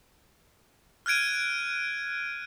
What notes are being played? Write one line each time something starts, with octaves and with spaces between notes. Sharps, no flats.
F6 F#6 G#6 D7 D#7